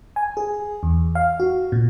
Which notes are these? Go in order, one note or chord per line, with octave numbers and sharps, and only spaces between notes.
G#5
G#4
E2
F5
F#4
A#2